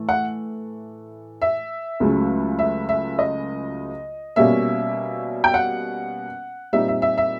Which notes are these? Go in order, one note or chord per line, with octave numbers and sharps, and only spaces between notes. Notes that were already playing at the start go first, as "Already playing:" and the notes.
Already playing: A2 E3 A3
F#5
E5
C#2 C#3 F#3 A3
E5
E5
D#5
B2 G3 A#3 C#4 E5
G5
F#5
A#2 G3 C4 D#4 E5
E5
E5
E5